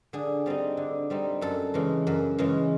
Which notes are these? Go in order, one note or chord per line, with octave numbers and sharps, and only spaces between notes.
D3 G#4
G3 C4 D#4
D3
G3 C4 D#4
F#2 A4
C#3 E3 G#3
F#2
C#3 E3 G#3